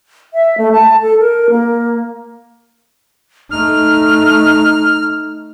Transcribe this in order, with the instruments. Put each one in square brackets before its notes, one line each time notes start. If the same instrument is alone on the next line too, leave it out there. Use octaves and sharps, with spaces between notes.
[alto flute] E5
A3
A5
A4
A#4
A#3
[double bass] A3 D#4 [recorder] F6